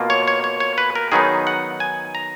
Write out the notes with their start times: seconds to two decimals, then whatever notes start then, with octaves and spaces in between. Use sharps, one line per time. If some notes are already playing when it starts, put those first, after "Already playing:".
Already playing: B2 A#3 F4
0.10 C#5
0.28 C#5
0.44 C#5
0.60 C#5
0.78 B4
0.95 A#4
1.12 D#3 F#3 B3 D#4 G#4
1.47 F#5
1.80 G#5
2.15 A#5